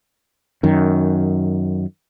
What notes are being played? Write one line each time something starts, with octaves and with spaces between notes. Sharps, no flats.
F#2 D#3